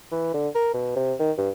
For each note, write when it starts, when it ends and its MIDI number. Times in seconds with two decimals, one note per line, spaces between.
0.12 0.33 52
0.34 0.49 50
0.55 0.69 70
0.74 0.93 47
0.96 1.14 48
1.19 1.32 51
1.38 1.50 43